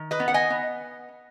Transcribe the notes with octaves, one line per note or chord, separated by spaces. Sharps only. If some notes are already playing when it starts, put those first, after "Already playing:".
Already playing: D#3
B4 D#5
B3
F#5
D#5 G#5
B3